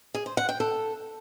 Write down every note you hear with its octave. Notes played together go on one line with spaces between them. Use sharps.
G#4
C5
F#5
G5
A4